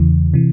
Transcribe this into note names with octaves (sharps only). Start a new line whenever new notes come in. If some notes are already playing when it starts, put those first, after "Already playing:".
Already playing: E2 C#3 E3
C3 E3